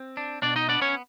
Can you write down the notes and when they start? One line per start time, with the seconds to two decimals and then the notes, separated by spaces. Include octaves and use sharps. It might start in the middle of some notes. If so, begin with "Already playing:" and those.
Already playing: C4
0.17 D4
0.42 B2 D4 D5
0.56 D#4 D#5
0.69 B3 D4 D5
0.82 C#4 C#5